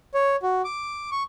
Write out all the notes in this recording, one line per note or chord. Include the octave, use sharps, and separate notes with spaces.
C#5
F#4
D6
C#6